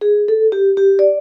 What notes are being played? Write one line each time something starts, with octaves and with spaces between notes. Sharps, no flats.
G#4
A4
G4
G4
D5